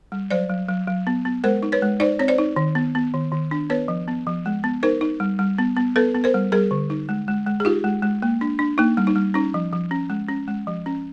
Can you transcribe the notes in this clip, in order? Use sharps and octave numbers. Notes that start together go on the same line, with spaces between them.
G3
F#3 C5 D5
F#3
F#3
F#3
B3
B3
G#3 A#4 C5
D#4
B4 C#5
G#3
D#4 C5 D5
C4 C#5
C5 D5
D#4
D#3
B3
B3
D#3
D#3
D4
B3 B4 C#5
F3
B3
F3
G#3
B3
D#4 A#4 C5
D#4
G3
G3
B3
B3
B3 A4 B4
B3
A#4 C5
G3
G3 G#4 A#4
D3
D#4
G#3
G#3
G#3
G#4
D#4 F4 G4
G#3
G#3
A#3
D4
D4
A#3 D#4
G3
D#4
G3
C#4 D#4
F3
F3
C#4
G#3
C#4
G#3
F3
C#4